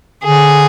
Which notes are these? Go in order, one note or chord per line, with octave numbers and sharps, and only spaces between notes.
D3 G#4